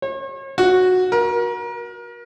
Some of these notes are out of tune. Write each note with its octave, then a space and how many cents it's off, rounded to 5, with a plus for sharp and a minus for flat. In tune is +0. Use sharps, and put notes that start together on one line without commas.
C#5 -45
F#4 -5
A#4 +30